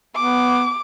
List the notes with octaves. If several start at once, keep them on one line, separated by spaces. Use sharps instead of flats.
B3 D6